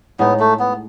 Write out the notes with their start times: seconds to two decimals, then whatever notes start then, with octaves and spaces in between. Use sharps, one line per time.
0.19 A2 G#3 B3 D#4
0.40 A3
0.59 B3